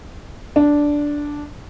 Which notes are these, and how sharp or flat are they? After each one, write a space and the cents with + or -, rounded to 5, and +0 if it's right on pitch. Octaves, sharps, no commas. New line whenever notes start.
D4 -5